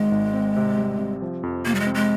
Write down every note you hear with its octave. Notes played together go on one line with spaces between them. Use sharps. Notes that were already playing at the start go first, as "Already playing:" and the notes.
Already playing: G#1 G#2 D#3 G#3 D#4
G#1
C4
C3
G3
C3
F3
F2
C3 A#3
G3
G#3
C4
G#3